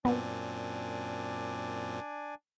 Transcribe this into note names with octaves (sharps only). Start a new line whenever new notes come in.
F#2 A#2 B3 C4 D4 D5 G#5